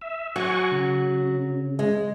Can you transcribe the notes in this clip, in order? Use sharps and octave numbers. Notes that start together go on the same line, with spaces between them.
E5
F#3 F#5 G#5 C#6
C#3
G#3